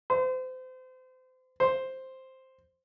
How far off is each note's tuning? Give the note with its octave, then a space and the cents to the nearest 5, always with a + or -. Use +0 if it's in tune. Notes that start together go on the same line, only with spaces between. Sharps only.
C5 -35
C5 +0